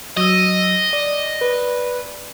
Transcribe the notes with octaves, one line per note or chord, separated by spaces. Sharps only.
F#3 D#5 E6
D5
B4